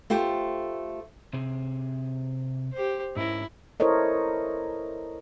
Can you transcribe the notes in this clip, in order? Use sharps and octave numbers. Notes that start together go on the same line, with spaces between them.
A3 F4 G4 C5
C3 C4 G#4
G4 C5
G#2 C#4 E4 A#4
E4 A4 A#4 C5 C#5 D#5